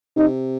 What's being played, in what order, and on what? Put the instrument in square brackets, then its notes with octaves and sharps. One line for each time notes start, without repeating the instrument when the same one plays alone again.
[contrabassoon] C3 [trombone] D#4